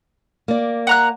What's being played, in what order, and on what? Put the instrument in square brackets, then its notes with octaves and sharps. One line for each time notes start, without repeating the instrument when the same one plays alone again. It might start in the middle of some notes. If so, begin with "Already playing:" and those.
[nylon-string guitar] A#3 D5
[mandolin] F#5 A#5 F#6